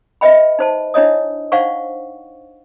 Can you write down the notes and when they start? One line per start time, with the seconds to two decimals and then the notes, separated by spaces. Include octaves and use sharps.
0.21 B4 D#5 E5 G5 B5
0.59 D#4 C5 A5
0.94 D4 E4 C#5 D#5 D#6
1.52 D4 D#4 C5 F5 F#5 C#6